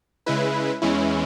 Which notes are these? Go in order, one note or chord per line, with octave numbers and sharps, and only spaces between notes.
C#3 G#3 E4 B4
E2 E3 G#3 C#4 E4